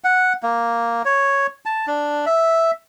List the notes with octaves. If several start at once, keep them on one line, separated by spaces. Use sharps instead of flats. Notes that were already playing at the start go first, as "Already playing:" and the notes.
F#5
A#3
C#5
A5
D4
E5